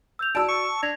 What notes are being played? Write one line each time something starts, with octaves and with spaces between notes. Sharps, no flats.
E6 G6 F7
F#4 D5 A5 E6 D7
C#6
D4 G#6 A#6 F7